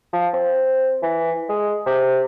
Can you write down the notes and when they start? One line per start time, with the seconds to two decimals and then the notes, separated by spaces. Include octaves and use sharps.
0.13 F3
0.34 C4
1.03 E3
1.49 G#3
1.86 C3